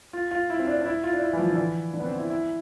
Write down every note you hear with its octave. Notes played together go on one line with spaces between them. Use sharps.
F4
F4
E4
C4
D4
D4
E4
F4
D4
E4
E3
F3
D3
E3
D3
B3
C4
E4
E4